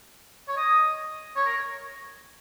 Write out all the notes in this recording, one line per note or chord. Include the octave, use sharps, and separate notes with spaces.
C#5
D#5
C#5
A#4